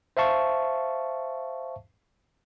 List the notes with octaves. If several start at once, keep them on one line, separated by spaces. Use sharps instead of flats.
C5 E5 F5 A5 C#6